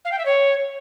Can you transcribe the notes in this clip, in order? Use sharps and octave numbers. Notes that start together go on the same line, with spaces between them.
F5
G5
E5
C#5